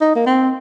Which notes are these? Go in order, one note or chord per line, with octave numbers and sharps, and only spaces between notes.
D#4
A#3
C4